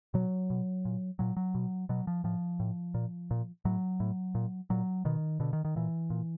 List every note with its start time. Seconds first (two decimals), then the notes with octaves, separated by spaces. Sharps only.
0.14 B2 F#3
0.50 B2
0.85 A#2
1.19 A#2 F#3
1.37 F#3
1.55 B2
1.89 B2 F#3
2.07 F3
2.24 A2 F3
2.60 A2
2.94 A#2
3.31 A#2
3.65 A2 F#3
4.00 A2
4.35 A#2
4.70 A#2 F#3
5.05 B2 D#3
5.40 B2 D3
5.53 D#3
5.65 D#3
5.76 A#2 E3
6.10 A#2